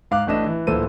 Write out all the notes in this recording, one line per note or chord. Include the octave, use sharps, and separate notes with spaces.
G#2 F5 D6 F#6
A1 A2 A3 D4 D#5 E7
E3
D1 A#2 E3 A4 C5 D#7